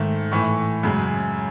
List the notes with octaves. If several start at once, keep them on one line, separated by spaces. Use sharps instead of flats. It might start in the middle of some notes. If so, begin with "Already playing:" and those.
Already playing: G#2 D#3 A3
A2 E3 A3 C#6
F#2 C#3 G#3